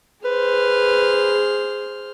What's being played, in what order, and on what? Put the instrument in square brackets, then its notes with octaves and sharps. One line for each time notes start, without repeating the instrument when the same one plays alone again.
[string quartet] G#4 C5 F6 [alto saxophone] B4